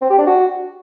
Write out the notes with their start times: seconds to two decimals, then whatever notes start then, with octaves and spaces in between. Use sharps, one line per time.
0.02 C4
0.10 G4
0.18 D4
0.27 F#4